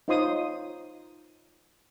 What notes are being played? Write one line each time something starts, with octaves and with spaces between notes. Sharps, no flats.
D#4 F4 C5 C#5 C6 D#6